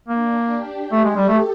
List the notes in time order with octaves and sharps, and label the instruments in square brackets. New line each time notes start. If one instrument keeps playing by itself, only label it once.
[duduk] A#3 [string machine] D4
[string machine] G4
G4
[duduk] A3
G#3
[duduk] G3 [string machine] A4
[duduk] A3